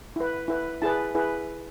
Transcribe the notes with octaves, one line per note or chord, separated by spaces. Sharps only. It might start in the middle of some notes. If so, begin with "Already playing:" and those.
E4 B4
E4 B4
E4 G#4 B4 A5
E4 G#4 B4